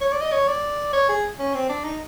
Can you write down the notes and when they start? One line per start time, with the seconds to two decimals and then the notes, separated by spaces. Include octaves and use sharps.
0.01 C#5
0.12 D5
0.21 D#5
0.32 C#5
0.48 D5
0.93 C#5
1.09 G#4
1.39 C#4
1.55 C4
1.69 D4
1.84 D#4